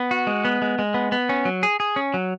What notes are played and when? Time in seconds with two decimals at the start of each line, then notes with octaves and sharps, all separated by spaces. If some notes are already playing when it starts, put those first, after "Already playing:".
Already playing: B3
0.11 F#4
0.27 G#3
0.45 B3
0.62 G#3
0.79 G#3
0.94 B3
1.12 B3
1.29 C#4
1.45 F#3
1.63 G#4
1.80 G#4
1.96 C#4
2.14 F#3